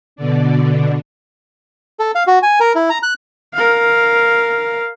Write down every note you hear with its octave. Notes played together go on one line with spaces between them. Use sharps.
B2 D3 D4
A4
F5
F#4
G#5
A#4
E4
A#5
F#6
A#4 F5